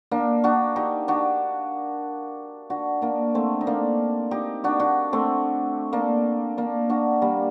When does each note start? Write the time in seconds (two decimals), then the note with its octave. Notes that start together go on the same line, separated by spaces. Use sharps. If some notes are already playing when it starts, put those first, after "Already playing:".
0.11 A#3 D4
0.44 D4 F#4
0.76 D#4 G4
1.08 D4 F#4
2.70 D4 F#4
3.02 A#3 D4
3.35 A3 C4
3.61 D#4
3.67 A#3 D4
4.31 D#4 G4
4.64 D4 F#4
4.80 D4 F#4
5.13 A3 C4
5.93 A#3 D4
6.57 A#3 D4
6.90 D4 F#4
7.22 G3 A#3